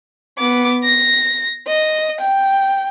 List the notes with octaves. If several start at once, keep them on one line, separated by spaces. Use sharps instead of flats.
B3 D6
A#6
D#5
G5